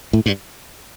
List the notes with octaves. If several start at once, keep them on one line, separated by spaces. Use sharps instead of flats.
A2
G2